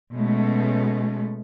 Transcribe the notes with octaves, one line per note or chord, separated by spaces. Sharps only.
B2 G#3 A3 C#4